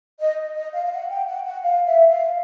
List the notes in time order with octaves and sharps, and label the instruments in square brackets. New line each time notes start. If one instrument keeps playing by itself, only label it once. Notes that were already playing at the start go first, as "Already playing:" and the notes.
[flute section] D#5
D#5
F5
F5
F#5
G5
F#5
F#5
F5
E5
F5